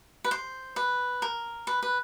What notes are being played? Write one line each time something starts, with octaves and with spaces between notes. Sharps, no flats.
B4
C5
B4
A#4
B4
B4